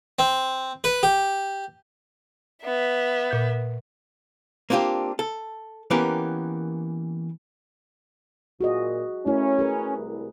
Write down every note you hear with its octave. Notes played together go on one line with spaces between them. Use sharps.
C4
B4
G4
B3 E5
A#2 G6
A#3 C4 D4 F4 G4
A4
E3 A#3 B3 C#4 G4 A#4
A#2 F#4 G#4 D#5
A3 C#4 E4 A#4
G#4 A#4 B4
C2